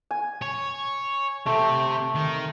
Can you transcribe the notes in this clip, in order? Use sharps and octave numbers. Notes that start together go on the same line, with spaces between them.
G#5
C#5
C3 A3 C4
D#3